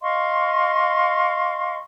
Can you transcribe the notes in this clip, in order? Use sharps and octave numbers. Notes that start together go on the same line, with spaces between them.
D#5 F5 C6 C#6